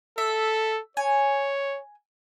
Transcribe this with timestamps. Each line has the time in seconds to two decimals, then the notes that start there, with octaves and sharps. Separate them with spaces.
0.18 A4 E5
0.97 C#5 G#5